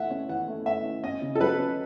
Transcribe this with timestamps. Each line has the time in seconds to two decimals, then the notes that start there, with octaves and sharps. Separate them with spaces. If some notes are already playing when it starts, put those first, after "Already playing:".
Already playing: E3 A3 E5 F#5
0.10 C#4
0.29 E3 F#5
0.48 A3
0.66 A3 E5
0.84 C#4
1.04 C#4 D#5
1.22 C#3
1.35 A4
1.41 F#3 B4
1.59 C#4